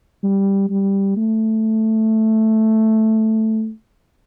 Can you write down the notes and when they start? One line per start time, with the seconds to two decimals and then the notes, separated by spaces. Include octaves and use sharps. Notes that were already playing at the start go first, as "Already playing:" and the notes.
0.23 G3
0.70 G3
1.17 A3